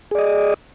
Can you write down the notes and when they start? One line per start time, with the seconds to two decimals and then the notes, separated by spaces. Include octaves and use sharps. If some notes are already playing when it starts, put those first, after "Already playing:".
0.11 G#4
0.15 D5
0.19 D#5